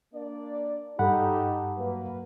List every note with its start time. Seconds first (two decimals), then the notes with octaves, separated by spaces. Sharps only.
0.14 A#3 D4 D5
0.99 G2 D#4 G4 A4 F#5 B5
1.77 F#3 A#3 B4